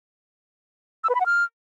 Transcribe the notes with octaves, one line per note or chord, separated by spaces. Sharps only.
E6
B4
B5
F#5
F6